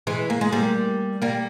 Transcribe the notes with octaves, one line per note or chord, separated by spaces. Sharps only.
E3 G#3
A#3
G#3
G3 A#3
G3 A#3